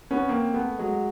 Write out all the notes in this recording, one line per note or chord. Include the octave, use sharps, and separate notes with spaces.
B3 C#4
A#3 C4
A3 B3
F#3 G#3